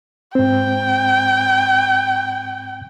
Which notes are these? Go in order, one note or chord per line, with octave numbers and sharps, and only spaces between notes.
G#2 C4 G5